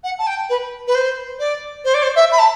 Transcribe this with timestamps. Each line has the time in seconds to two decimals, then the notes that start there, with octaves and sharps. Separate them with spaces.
0.04 F#5
0.19 A5
0.27 G5
0.49 B4
0.87 B4
0.95 C5
1.39 D5
1.85 C5
1.94 D5
2.03 C5
2.16 E5
2.32 B5
2.39 A5